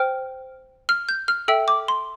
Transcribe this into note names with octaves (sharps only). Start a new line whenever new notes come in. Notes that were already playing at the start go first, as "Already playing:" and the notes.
Already playing: C5 G5 F6
F6
G6
F6
A4 E5 G5 E6
D6
C6